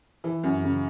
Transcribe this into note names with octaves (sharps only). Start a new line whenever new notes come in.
E3
F#2
C#3